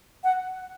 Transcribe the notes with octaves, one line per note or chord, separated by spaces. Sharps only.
F#5